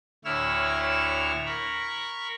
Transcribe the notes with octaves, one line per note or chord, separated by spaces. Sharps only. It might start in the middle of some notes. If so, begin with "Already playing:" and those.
D2 A2 E4 C#5 E6 F6
A#4 B5 C#6